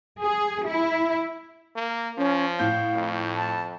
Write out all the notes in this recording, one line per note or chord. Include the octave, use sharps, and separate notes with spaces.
G#4
E4
A#3
F3 C#4
A2 F5 G6
F2
A5